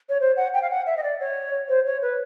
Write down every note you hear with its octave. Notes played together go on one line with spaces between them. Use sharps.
C#5
C5
F#5
G5
F5
F#5
E5
D#5
D5
C#5
C5
C#5
B4